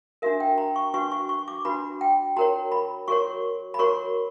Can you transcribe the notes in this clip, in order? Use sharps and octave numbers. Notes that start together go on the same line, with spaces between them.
D4 F#4 A#4 E5
G5
A#5
C#6
D4 F#4 B4 C#6
C#6
C#6
D6
D4 F#4 B4 B5
G5
F#4 A#4 C#5 A#5
B5
F#4 A#4 C#5 C#6
B5
F#4 A#4 C#5 C#6